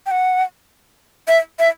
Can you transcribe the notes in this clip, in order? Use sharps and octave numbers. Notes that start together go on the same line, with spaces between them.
G5
F#5
E5
E5